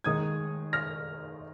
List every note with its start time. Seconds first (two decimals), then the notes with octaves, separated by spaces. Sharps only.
0.04 D#2 D#3 G#3 D#4 D#6 G#6
0.73 F6 A#6